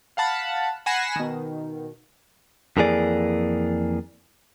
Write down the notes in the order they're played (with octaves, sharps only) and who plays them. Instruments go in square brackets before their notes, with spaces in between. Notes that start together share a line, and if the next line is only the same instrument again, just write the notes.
[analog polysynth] F5 F#5 A5 B5
F#5 G#5 B5 A#6 C7 E7
B2 D#3
[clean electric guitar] F2 E3 A#3 G#4 D5